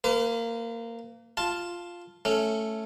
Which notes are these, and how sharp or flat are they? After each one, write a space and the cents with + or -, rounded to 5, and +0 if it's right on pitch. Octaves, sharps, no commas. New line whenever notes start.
A#3 -15 B4 +40
F4 +0 A5 +0
A3 +0 C#4 +0